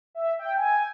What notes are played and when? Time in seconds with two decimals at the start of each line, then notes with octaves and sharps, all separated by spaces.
0.15 E5
0.39 G5
0.58 G#5